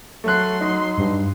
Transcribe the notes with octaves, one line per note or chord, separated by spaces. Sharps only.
F#3 A3 C6 F#6
D#4
G2